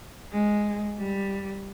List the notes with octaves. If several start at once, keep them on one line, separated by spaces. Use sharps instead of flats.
G#3
G3